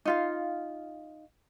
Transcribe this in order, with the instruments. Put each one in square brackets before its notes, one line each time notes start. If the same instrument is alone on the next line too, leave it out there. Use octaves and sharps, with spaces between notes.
[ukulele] D#4 F4 F5